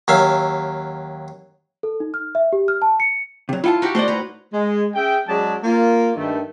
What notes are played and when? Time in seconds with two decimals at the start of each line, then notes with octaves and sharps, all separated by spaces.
0.08 D#2 F#3 E5 F5
1.83 A4
2.00 D#4
2.14 F6
2.35 E5
2.53 G4
2.68 F6
2.82 A5
3.00 C#7
3.49 C3 F#3
3.64 E4 F4 F#5 A5
3.82 D#4 F#4 G4
3.95 A3 C5 D5 D#5 F#5
4.08 A2 B4 A#5
4.53 G#3
4.94 C#4 G#4 E5 G5
5.28 F#3 G#3 C#4 G#4 D5 A5
5.64 A#3 F4
6.16 G2 D#3 A3